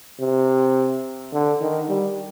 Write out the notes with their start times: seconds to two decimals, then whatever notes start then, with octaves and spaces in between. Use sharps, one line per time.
0.20 C3
1.33 D3
1.61 D#3
1.89 G3